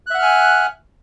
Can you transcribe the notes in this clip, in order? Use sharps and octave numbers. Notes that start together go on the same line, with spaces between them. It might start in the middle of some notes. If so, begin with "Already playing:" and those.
E5 F#5 G#5 F6 F#6